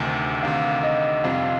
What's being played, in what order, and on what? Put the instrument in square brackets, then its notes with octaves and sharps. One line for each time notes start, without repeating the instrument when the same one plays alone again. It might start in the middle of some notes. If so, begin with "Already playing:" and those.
Already playing: [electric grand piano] D2 C3 D#3
[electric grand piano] D2 C3 D#3 [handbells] F5
[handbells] D#5
[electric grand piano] F2 C3 G3 C4 F4 [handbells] F5